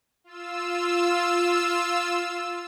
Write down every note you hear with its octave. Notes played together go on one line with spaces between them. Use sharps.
F4 E6